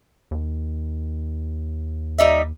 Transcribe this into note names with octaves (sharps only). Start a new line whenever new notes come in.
D#2
G3 D#4 E5